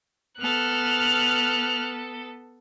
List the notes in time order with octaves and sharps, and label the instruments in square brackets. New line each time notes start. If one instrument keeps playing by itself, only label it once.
[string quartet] B3 A4 [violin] F6 F#6